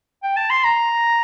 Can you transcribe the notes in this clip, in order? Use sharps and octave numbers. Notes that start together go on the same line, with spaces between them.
G5
A5
C6
A#5